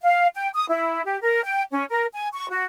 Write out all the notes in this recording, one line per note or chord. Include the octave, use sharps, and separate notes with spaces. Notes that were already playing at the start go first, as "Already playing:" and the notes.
F5
G5
D#6
E4
G4
A#4
G5
C#4
A#4
G#5
C#6
F#4